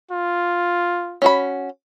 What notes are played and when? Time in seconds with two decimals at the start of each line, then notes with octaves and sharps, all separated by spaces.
0.11 F4
1.22 C#4 F#4 B5